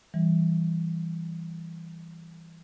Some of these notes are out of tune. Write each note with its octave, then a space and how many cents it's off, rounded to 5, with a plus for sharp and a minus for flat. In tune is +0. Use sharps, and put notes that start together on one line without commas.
E3 +0 G3 +0